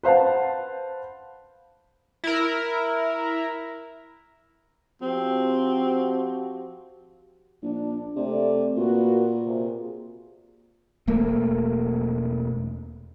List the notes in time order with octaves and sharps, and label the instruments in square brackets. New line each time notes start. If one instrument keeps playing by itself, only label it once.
[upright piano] B4 C5 F5 F#5 A5
[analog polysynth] E4 A#4
[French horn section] F3 F#4 G4 [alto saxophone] C4
[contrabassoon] A#1 [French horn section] D4
[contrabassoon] C3 [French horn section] A3 D5
[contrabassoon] A#2 [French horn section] A#3 F#4 B4
[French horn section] C3 A#3 G#4
[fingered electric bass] E1 A3 A#3